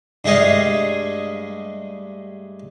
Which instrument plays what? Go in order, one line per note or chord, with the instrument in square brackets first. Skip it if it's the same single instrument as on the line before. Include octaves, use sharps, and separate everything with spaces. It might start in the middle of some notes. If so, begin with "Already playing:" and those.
[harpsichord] G2 G#3 A3 G#4 D#5 F5